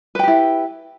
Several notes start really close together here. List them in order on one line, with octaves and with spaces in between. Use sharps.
B4 G5 G4 E4